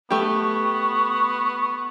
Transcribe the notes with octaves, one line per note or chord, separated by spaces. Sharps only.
A3 B3 G4
C#6